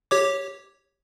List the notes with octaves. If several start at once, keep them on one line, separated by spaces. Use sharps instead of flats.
G4 C#5 D6